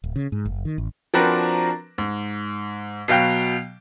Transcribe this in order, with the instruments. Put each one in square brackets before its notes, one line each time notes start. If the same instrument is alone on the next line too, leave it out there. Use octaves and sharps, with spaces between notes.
[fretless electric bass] D1
C#3
G#2
F#1
D#3
A1
[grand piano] F3 C4 D4 F#4 A#4 B4
G#2
B2 F#3 F5 G5